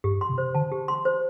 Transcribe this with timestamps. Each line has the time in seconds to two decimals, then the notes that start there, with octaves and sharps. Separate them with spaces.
0.04 G2 G4
0.21 C6
0.29 C3
0.38 C5
0.55 D3 A5
0.72 G4
0.88 C6
1.05 C5